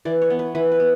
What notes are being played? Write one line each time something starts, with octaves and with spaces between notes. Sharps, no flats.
E3 D5
C#5
B3
B4
E3 B4
B4
B3